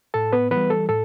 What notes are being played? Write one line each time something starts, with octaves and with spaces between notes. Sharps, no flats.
A2 A4 A5
B3 B4
E3 G3 B3 B4
A4
A2 A4